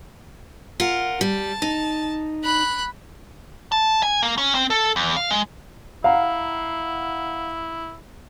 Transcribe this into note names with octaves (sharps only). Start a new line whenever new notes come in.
F4 A#4 F#5
G3 A5
D#4
B5 F#6
A5
G#5
A#3
C#4
C4
A4
E2
F5
G#3
E4 F5 F#5 A#5